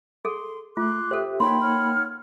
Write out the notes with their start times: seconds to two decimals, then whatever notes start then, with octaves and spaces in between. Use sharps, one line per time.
0.25 G#4 A4 C6
0.77 A3 F4 C6 D6 F#6
1.11 G4 A4 C5 E5
1.40 A#3 D#4 C#5 E5 G5 B5 C6
1.61 C#5 F#5 F6